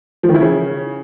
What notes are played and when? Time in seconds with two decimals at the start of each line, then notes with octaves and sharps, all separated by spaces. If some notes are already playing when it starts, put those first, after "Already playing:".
0.23 F3
0.29 D#3
0.34 E4
0.40 C#3